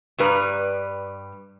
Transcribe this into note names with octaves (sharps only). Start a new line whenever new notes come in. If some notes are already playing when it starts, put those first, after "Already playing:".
G2 G3 B4 A#5